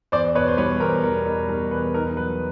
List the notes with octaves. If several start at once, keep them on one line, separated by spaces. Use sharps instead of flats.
E2 C5 D5
B2 B4 C#5
C5
G3 B4 C#5
E2 A#4 C5
E2 A#4
B2 A#4
G3 A#4
E2 B4
D#4 A#4
F#3 B4